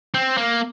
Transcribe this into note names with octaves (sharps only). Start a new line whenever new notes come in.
C4
A#3